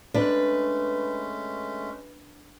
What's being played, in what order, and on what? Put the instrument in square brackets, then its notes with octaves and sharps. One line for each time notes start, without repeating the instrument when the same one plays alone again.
[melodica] G#3 A3 C#4 [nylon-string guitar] D4 [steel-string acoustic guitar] B4